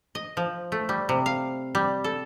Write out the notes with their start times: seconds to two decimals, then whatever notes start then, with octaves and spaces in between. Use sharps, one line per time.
0.15 D#5
0.37 F3
0.72 A3
0.89 G3
1.09 C3
1.26 F5
1.75 G3
2.04 A4